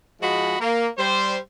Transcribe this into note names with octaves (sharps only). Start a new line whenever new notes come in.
G#2 F3 G#3 F#4 D#5 B5
A#3
G3 C5